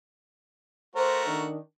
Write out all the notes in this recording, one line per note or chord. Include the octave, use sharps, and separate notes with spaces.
A3 F#4 A#4 C5
D#3 D4